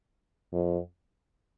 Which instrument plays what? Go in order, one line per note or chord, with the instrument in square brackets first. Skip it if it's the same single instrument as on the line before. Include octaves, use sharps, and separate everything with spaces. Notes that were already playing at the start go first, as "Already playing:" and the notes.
[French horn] F2